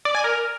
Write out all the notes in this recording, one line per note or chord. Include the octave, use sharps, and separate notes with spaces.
D5
G#5
A#4